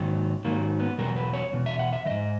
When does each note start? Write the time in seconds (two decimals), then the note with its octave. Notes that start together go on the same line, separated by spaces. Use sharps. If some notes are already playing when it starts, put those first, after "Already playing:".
Already playing: G#2 D#3 F#3
0.45 G#2 D#3 F#3 A#3
0.80 B3
0.98 E2 B2 F#3 A#4
1.16 B4
1.33 C#5
1.53 E2 B2
1.66 E5
1.79 F#5
1.93 E5
2.05 G#2 E3 D#5